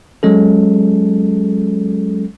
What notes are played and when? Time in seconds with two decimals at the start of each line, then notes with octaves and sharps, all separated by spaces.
0.23 F#3 G#3 C#4 A4